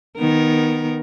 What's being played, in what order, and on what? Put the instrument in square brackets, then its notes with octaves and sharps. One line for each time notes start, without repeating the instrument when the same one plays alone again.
[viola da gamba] D#3 B3 A#4